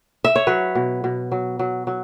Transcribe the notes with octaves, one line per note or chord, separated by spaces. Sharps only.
E5
C#5
F#3 B4
B2
B2
F#3
F#3
F#3